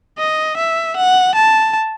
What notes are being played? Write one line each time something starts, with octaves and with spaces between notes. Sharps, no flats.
D#5
E5
F#5
A5